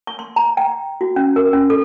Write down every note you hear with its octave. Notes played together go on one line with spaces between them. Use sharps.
C#6
C6
A#5
G5
F#4
C#4
A#4
C#4
A4